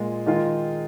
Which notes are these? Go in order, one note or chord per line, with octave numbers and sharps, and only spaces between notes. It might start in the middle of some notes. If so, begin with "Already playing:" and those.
Already playing: A#2 G#3 F4
D#3 G#3 F4